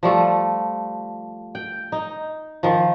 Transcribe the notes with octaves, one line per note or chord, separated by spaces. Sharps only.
F3 G3 A3
G5
D#4
D#3 F3